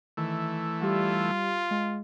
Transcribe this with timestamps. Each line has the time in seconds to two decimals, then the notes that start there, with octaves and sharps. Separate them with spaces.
0.17 D#3 E3 A3
0.82 G3 F4 G4
1.71 G#3